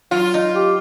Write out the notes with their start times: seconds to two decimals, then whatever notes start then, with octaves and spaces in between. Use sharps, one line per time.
0.11 F#3 F4
0.34 D#4
0.56 G4